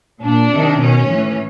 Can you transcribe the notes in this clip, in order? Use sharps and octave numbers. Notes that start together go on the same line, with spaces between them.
A#2 D4
C3 D#3
B2 C#4
A2 E3